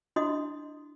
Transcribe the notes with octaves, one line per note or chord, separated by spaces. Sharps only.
D4 E4 F#4 D#5 C6 D#6